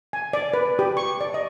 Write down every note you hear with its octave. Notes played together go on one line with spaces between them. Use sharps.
G#5
D5
B4
G4
C#6
D5
D#5